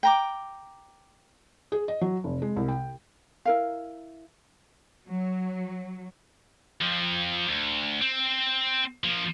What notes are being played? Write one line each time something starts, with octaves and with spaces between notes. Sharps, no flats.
G5 A#5 D6
G#4
D#5
F#3
F1
G#3
C2
G5
E4 A#4 F5
F#3
F2 F3
D2
C4
F3 A#3